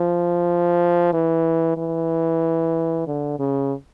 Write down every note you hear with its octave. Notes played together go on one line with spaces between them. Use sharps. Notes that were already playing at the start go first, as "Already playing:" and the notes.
Already playing: F3
E3
E3
D3
C#3